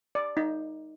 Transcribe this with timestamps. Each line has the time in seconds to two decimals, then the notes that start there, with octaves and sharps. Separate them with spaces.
0.15 D5
0.37 D#4